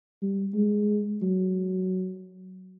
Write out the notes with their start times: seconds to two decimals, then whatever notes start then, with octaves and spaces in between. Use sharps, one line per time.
0.22 G3
0.54 G#3
1.22 F#3